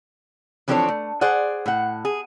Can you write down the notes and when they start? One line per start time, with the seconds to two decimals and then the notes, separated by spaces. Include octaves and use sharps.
0.68 E3 F3 C4 D4 A4 C#5
0.88 A3
1.21 G#4 C5 D5 F#5
1.66 A2 F#5
2.05 G#4